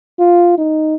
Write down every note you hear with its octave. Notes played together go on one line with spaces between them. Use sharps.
F4
D#4